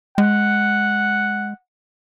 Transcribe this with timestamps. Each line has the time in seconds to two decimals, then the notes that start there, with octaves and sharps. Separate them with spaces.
0.18 G#3 F#5